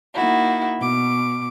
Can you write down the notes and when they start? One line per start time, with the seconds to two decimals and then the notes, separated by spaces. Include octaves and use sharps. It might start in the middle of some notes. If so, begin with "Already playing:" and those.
0.15 A#3 D#4 E4 F#4
0.79 B2 D6